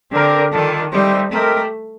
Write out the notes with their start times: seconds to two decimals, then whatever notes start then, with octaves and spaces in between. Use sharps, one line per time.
0.12 D3 C4 G4 A#4 D5
0.52 D#3 G3 D4 F4 A4
0.92 G3 A3 C4 D#4 G4 C5
1.31 A3 C4 G4 A#4 D#5